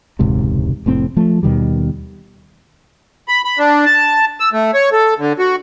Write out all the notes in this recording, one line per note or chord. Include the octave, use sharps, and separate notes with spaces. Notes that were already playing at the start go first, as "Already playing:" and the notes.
E1 C#2 G#2 C3
F1 A2 C4
F3 A3
D#2 B2 D#3 G3
B5
B5
D4
A5
E6
A3
C#5
A4
D3
F#4